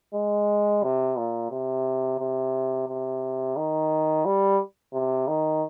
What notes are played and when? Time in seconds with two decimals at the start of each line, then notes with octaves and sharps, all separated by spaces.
0.14 G#3
0.83 C3
1.17 A#2
1.51 C3
2.19 C3
2.88 C3
3.57 D#3
4.25 G3
4.94 C3
5.28 D#3